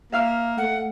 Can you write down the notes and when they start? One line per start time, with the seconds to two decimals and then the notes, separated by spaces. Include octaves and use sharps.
0.12 A#3 E5 F5 F6
0.58 A3 F#5